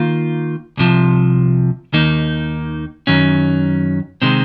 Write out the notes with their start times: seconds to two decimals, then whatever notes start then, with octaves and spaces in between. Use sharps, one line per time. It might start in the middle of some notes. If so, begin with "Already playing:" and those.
Already playing: D#3 A#3 F4
0.77 C2 C3 F3
1.93 D#2 D#3 A#3 D#4
3.07 F#2 D#3 F#3 C#4
4.22 C3 D#3 G#3 C4